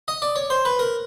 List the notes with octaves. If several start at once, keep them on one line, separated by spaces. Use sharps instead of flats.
D#5
D5
C#5
C5
B4
A#4